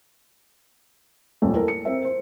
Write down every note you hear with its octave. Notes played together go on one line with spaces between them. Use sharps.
D#1 A1 F2 A3
E4 A4 A#4
C#7
C4 A#4 E5
C5